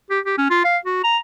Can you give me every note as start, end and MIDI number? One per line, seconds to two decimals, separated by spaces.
0.10 0.19 67
0.25 0.37 67
0.38 0.45 61
0.50 0.63 65
0.64 0.78 77
0.85 1.02 66
1.04 1.18 82